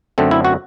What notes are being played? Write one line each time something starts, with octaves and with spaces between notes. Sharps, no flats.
F#2 D3 A3 C4
E4
F#4